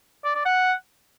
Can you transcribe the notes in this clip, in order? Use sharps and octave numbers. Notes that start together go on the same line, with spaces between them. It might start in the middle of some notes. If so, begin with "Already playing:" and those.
D5
D5
F#5